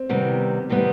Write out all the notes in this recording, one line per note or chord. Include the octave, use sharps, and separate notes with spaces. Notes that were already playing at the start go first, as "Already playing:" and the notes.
Already playing: C4
C3 D#3 G3 B3
C3 D#3 G3 B3